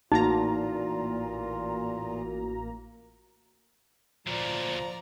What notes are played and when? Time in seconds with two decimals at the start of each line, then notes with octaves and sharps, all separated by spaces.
0.12 A1 E2 A#2 A#3 D#4 F4 F#4 A#5
4.27 D2 A#2 F3 D5 A#5